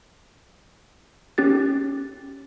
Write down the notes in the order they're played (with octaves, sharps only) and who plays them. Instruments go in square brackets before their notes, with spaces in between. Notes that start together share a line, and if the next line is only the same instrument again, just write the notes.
[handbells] C#4 G4 A6